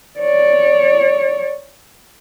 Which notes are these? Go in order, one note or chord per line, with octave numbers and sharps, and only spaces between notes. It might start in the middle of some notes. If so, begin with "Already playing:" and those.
C#5 D5